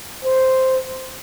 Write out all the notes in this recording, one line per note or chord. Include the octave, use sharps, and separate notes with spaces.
C5